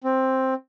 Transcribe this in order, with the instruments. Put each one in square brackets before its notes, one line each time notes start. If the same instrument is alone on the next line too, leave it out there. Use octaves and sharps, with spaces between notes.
[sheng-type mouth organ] C4